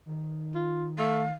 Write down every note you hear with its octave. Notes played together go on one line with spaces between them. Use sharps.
D#3
F4
A3 F5